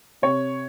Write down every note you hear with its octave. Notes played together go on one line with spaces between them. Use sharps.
C3 C#5